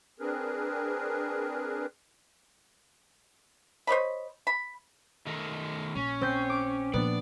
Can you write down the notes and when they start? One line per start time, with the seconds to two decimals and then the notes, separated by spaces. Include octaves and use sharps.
0.20 C4 D4 G#4 A#4 B4
3.87 C5 C#5 D#5 B5
4.47 B5
5.26 D#3 A3 A#4
5.95 A#1 C#4
6.21 C4 G6 C7
6.50 D6
6.94 A#2 F3 B3 D4 D5